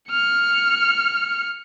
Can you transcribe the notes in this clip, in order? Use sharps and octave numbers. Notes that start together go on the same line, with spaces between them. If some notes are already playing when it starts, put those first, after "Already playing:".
F6 C#7